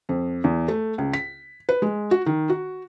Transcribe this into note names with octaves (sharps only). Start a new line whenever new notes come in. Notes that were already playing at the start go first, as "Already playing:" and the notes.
F2
E2
A3
C#2
B6
B4
G#3
F#4
D#3
F#4